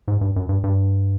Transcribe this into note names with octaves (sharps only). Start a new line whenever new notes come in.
G#2
G2
F#2
G2
G2